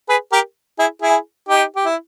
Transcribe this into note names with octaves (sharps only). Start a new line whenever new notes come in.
G#4 B4
G4 A#4
E4 G#4
E4 G#4
D#4 G4
G4
E4